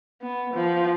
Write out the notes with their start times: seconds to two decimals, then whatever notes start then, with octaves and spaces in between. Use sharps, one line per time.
0.22 B3
0.53 F3